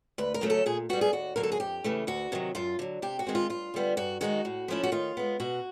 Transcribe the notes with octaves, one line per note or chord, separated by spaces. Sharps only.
D2 B4
A#4
C#3 F#3 A3 C#4
A4
A#2 G#4
G3 B3 F#4
G#4
D#2 F#4
D3 F#3 A#3 A#4
A4
G#4
F2 G4
C#3 E3 A3
D2 F#4
C3 D#3 F#3
F#2 F4
D3 F#3
C3 G4
F#4
D#3 G#3 C4
F4
G2 F4
D3 G3 B3
G2 F#4
D#3 G#3 B3 D#4 F#4
A2
F3 A3 C#4 E4
F#4
D#3 F4
G#3 B3
B2 F#4